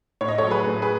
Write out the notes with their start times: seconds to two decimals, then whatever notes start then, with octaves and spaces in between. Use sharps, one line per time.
0.21 A2 C#5
0.28 D#5
0.38 F#3 A4 C#5
0.50 G#4 B4
0.67 A2
0.82 G#4 B4